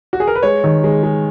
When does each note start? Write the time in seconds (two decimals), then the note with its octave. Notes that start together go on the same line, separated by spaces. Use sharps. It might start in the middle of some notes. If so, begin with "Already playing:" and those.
0.13 F#4
0.20 G#4
0.27 A#4
0.35 B4
0.43 G#3 C#5
0.64 D#3
0.84 G#3
1.03 G#3